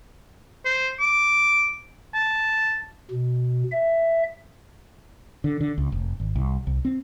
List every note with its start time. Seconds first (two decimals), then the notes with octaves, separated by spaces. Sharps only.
0.65 C5
1.00 D6
2.14 A5
3.11 B2
3.72 E5
5.44 D3
5.61 D3
5.78 C#2
5.92 F1
6.20 G#1
6.36 C2
6.67 C2
6.85 C4